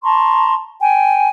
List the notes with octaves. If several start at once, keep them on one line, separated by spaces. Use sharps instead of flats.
A5 A#5 C6 C#6
G5 G#5